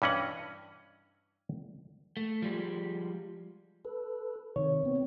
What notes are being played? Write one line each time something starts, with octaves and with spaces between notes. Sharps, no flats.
G2 E3 C#4 D#5 F#5
A3
F3 G3 G#3
A4 B4
C3 D#3 C#5
B3 C4